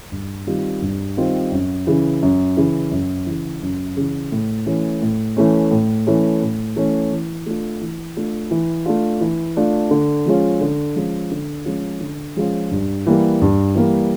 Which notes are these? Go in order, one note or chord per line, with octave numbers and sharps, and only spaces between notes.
G2
D#3 G3 C4 F4
G2
D#3 G3 C4 F4
F#2
C#3 E3
F#2
C#3 E3
F#2
C#3 E3
F#2
C#3 E3
A2
E3 A3 C#4
A2
E3 A3 C#4
A2
E3 A3 C#4
A2
E3 A3 C#4
E3
A3 D4 F4
E3
A3 D4 F4
E3
A3 D4 F4
E3
A3 D4 F4
D3
F3 G#3 C#4 F4
D3
F3 G#3 C#4 F4
D3
F3 G#3 C#4 F4
D3
F3 G#3 C#4 F4
G2
E3 G3 A#3
G2
E3 G3 A#3